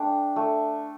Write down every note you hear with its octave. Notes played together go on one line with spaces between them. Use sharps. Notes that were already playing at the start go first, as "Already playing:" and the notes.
Already playing: A3 D4 G5
A3